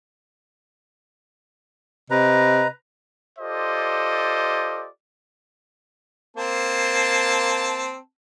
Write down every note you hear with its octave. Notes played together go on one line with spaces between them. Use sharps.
C3 B4 D#5 A#5
F4 G4 A4 C5 D5 D#5
A#3 C4 A5